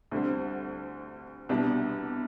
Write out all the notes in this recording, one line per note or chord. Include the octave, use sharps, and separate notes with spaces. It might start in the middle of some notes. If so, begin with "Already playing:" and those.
D2 D3 G3 C4
C2 B2 G3 D4